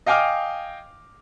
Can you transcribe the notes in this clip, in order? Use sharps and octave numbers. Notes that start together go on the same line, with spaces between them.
D#5 F5 G5 G#5 D6 F6